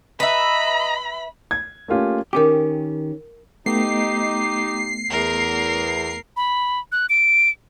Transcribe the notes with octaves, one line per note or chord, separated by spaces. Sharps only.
B4 D#5 E5 A#5 B5
G#6
A3 A#3 C#4 F4 G4
D#3 C#4 G4 A#4 D6
A3 B3 D#4 G4 C7
E2 A#4
B5
F#6
D7